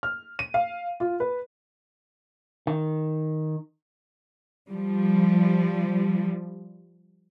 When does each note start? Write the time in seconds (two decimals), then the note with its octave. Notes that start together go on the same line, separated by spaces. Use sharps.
0.03 F6
0.39 D#7
0.54 F5
1.00 F4
1.20 B4
2.67 D#3
4.68 F3 G3